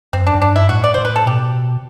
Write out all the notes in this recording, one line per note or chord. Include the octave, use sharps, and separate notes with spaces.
F#2 C4
D4
F#2
G2 D4
E4
A2 F#4
D5
A2 C5
B4
A4
B2 G4